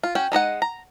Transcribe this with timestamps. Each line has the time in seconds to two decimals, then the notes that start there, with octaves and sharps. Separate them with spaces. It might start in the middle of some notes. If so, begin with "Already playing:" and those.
0.03 F4
0.15 C#4 F#4 G5
0.32 G#3 D#4 D#5 F#5
0.62 A#5